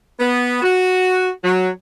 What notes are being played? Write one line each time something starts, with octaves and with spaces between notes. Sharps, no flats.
B3
F#4
F#3